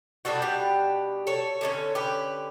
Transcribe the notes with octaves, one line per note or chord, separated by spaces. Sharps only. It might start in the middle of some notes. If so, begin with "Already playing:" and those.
B2 G3 D4 F#4 A4
G4 B4
A4 C#5
D3 A3 C#4
G4 B4